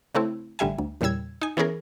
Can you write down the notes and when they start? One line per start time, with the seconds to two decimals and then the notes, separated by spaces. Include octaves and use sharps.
0.15 C#3 A3 C4 E4
0.59 A1 D3 G3 E5 G#5
0.78 D2
1.01 E2 A#2 C#3 G3 E6 G#6
1.41 D#4 G#5
1.57 E3 B3 C#4 G#4 A#4